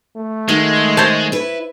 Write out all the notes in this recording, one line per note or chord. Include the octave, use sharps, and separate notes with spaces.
A3
D#3 G#3 F#4
C5 C#5 A5
E4 B4